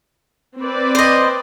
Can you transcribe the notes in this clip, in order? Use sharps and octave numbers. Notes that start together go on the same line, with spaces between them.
C4 B4 D5
C5 D#5